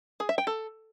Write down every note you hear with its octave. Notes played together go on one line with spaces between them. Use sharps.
G#4
E5
G5
A4